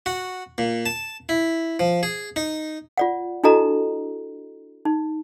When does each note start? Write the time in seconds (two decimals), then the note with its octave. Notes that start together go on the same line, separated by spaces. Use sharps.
0.06 F#4
0.58 A#2
0.86 A5
1.29 E4
1.80 F3
2.03 G#4
2.36 D#4
2.97 F4 D5 F#5
3.44 D4 E4 F#4 A4 D#5 A#5
4.85 D#4